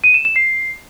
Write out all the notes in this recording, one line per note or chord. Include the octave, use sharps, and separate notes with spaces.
D#7
E7
E7
C7